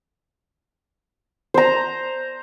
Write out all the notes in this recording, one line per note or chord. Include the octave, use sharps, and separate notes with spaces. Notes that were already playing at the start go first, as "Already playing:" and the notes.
C5 A#5